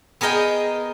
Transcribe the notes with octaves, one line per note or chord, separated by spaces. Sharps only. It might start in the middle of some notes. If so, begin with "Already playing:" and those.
B3 G#4 A#4 D#5 G5